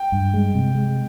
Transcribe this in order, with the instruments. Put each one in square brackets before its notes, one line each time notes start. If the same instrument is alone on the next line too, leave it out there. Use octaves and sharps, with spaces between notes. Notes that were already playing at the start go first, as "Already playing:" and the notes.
Already playing: [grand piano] G5
[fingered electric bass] G2
G#3
C3
G#3